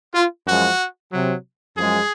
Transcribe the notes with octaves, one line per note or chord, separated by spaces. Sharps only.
F4
F#2 F3 G#3 F#4
C3 F#3
F#2 F3 G#3 G#4